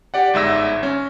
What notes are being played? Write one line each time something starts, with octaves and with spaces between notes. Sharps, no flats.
G4 D5 F#5
G1 G#2 E5 E6 A#6
C#4